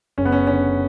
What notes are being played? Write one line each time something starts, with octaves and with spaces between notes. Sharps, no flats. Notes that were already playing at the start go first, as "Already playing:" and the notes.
F#1 C#4
B3
C#4
D3 C#4